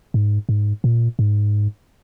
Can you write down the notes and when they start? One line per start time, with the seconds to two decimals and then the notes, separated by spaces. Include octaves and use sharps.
0.14 G#2
0.49 G#2
0.84 A#2
1.19 G#2